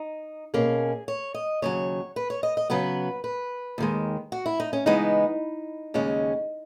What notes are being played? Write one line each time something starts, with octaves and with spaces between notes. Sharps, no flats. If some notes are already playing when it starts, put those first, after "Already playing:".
Already playing: D#4
B2 A#3 C#4 G#4
C#5
D#5
D#2 C#3 F#3 C#5
B4
C#5
D#5
D#5
C#3 F#3 B3 B4
B4
D#2 D#3 G#3
F#4
E4
D#4
C#4
C#3 E3 G#3 B3 D#4
D#2 C#3 G#3 C#4